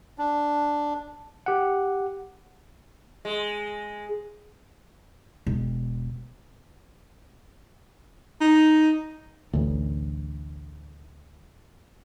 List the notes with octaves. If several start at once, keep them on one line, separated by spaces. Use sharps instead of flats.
D4
G4 F#5
G#3
E1
D#4
A1 D2